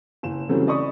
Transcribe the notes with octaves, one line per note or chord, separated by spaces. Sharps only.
F#1 E7
C#3 E3 F#3 G3 A3 C4
D5 D#5 B5 C#6 D#6